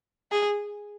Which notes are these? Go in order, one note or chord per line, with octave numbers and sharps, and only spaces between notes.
G#4